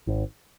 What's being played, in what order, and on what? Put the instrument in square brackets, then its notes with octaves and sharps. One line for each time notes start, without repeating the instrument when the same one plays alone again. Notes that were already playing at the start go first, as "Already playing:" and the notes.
[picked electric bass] G#1